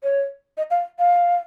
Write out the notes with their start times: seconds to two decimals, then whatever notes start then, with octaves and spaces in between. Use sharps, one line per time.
0.03 C#5
0.57 D#5
0.70 F5
0.99 F5